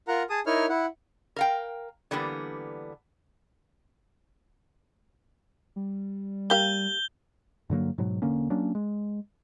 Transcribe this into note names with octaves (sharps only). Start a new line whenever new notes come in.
F4 A#4 F#5 A#5
G#4 A5 D#6
D#4 E4 A#4 C#5 F6
E4 F#5
A#4 F5 G5
D3 E3 G3 A#3 B3
G3
A#3 G4 F5 G6 G7
G2 D3 F#3 A#3
G#2 B2 F#3
E1 D3 A#3 C#4
F#3 A#3 C#4 D4
G#3